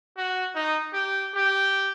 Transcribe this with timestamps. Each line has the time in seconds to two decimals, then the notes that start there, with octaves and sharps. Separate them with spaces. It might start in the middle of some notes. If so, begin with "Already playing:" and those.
0.17 F#4
0.55 D#4
0.94 G4
1.35 G4